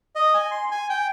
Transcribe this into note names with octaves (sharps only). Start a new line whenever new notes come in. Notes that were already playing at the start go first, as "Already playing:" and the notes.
D#5
G#5
C6
G#5
G5